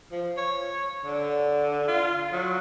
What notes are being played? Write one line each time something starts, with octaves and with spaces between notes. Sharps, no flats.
F3
C#5
D3
F4
F#3